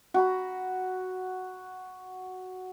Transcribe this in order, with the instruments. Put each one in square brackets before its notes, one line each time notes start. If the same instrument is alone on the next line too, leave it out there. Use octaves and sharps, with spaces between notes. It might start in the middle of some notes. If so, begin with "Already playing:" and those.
[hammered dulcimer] F#4 A#5 B5